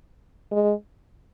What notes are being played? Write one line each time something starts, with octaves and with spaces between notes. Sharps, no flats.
G#3